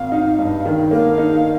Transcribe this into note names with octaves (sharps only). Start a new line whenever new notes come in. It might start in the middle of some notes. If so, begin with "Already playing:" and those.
Already playing: G#1 F5
D#4
G2
D#3
A#3 F5
D#4